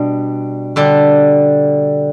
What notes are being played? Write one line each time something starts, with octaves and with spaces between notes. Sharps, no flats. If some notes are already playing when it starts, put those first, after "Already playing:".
Already playing: B2 G3 D4
D3 G3 D4